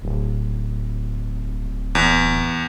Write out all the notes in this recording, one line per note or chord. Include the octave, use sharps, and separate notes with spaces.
D1
E2